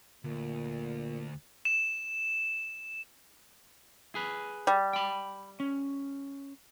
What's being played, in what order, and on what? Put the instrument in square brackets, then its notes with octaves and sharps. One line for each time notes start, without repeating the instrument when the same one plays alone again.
[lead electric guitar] D2 [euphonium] A#2
[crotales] E7
[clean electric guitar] G#4 B4
[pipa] G3
[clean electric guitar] G5 B5
C#4